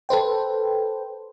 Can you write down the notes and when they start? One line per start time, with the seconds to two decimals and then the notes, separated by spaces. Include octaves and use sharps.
0.09 A4 B4 C5 G5